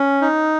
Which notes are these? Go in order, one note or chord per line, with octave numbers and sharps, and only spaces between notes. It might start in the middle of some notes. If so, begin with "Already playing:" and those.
Already playing: C#4
D#4